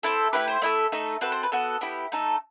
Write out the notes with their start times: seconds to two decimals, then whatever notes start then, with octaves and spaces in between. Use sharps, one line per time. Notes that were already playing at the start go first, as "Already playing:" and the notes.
0.03 C4 E4 A4
0.33 A3 E4 G4 B4
0.48 C5
0.62 A3 E4 A4 D#5
0.92 A3 D#4 A4
1.21 C4 F#4 A4 B4
1.32 C5
1.43 B4
1.52 B3 F#4 A4
1.81 B3 E4 G4
2.12 A3 D#4 A4